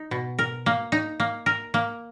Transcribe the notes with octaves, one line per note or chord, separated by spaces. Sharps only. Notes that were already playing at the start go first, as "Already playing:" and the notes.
Already playing: D#4
B2
A#4
A#3
D#4
A#3
A#4
A#3